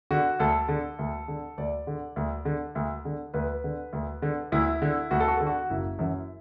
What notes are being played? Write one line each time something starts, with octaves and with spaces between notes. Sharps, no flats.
D3 F#4
D2 A4
D3
D2
D3
D2 D5
D3
D2
D3
D2
D3
D2 B4
D3
D2
D3
D2 E4
D3
D2 F#4
A4
F#4
D3 A4
F#4
F#1 E4
F#2 E3